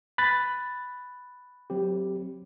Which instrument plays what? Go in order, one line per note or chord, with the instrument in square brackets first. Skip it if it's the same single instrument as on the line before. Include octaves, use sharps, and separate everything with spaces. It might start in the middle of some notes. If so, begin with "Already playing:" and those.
[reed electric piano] B5 F#6 A6
[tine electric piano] F#3 C4 G4